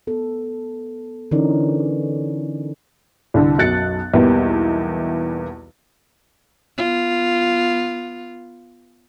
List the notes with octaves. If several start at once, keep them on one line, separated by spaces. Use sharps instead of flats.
B3 A4
D3 E3 C#4 D#4 A#4 D5
C2 D3
B1 F#2 F#6 A6 C#7
B1 E2 E3 G3 A#3
B3 F4